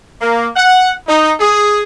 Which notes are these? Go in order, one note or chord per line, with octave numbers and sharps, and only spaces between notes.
A#3
F#5
D#4
G#4